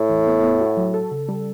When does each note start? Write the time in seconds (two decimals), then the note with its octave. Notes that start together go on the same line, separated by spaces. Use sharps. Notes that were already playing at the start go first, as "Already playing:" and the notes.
Already playing: A2
0.10 E2
0.27 B3
0.43 B3
0.60 F#4
0.77 F#3
0.94 A4
1.11 C#3
1.29 G3